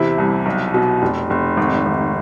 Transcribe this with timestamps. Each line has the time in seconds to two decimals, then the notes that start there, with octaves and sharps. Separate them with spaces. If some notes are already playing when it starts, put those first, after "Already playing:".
Already playing: E2 C3 E4
0.18 C2
0.46 B1
0.74 B2
1.02 F1
1.30 F1
1.57 G#1
1.86 G#1